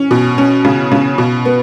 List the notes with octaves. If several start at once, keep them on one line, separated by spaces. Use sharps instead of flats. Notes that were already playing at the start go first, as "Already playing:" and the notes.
Already playing: C#4
B2
C#4
C#3
C#3
B2
B3